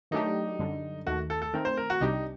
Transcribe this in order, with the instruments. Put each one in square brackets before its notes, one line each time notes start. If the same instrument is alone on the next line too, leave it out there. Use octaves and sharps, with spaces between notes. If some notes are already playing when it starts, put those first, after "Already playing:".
[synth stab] D#3 F#3 A3 D4 G4 [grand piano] D#4
[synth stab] F#2 D3 G3
[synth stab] D#2 D#3 A3 [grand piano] F#4
[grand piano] A4
A4
[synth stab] D#3 A3 C4 [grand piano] A#4
[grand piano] C5
A#4
F#4
[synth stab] C2 C3 G3 D4 G4 [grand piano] D#4